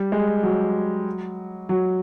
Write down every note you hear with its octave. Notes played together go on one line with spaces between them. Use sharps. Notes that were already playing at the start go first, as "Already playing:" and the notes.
Already playing: G3
G#3
F#3
F#3